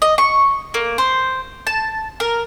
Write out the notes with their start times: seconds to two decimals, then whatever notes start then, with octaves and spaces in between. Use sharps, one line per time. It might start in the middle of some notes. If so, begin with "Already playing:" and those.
0.02 D#5
0.18 C#6
0.74 A#3
0.98 C5
1.67 A5
2.20 A#4